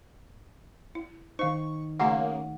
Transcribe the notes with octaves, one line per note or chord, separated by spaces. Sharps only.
E4
D#3 D#4 C5 F5 C#6
C#3 A3 A#3 F#4 F#5 G#5